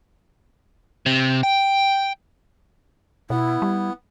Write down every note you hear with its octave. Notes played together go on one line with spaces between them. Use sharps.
C3
G5
B2 B3 E4
G3